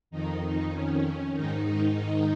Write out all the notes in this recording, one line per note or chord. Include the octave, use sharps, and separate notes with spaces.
F2 D#3 D#4
D#4
C#4
G#2 D#3 D#4
D#4
D#4